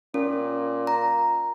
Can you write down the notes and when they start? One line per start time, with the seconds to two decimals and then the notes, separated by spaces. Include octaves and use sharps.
0.14 A#2 C#4
0.87 A#5